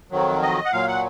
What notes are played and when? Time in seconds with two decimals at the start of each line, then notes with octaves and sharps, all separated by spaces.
0.11 F2 D#3 F#3
0.42 D#5
0.65 F#5
0.72 A#2 F#3 F5
0.88 F#5